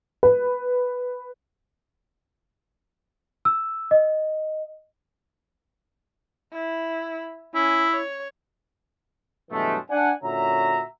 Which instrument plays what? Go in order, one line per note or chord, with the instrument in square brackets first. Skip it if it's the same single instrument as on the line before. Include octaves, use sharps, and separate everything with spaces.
[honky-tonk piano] B4
[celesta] E6
D#5
[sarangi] E4
[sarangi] C#4 [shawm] E4
[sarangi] C#5
[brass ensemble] G2 B2 E3 F#3 G#3 A3
D4 F#5 G#5
A#2 D3 C#4 F#4 E5 A#5